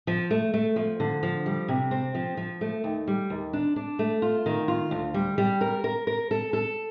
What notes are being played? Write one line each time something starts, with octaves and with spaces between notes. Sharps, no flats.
F3
A3
A3
F3
D3
F3
G3
C3
C4
F3
F3
A3
D#2
G3
D#2
D4
D4
A3
F4
D#3
F4
D2
G3
G3
A#4
A#4
A#4
A4
A4